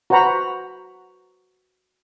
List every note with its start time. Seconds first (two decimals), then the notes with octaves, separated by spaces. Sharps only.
0.10 F#4 B4 C5 F#5 A#5 B5